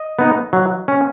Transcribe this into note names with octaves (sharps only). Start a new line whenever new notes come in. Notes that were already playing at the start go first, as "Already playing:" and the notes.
Already playing: D#5
B3 D#4
F#3
C#4